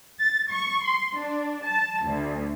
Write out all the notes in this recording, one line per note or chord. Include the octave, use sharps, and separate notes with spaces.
A6
C#6
C6
D4
A5
D2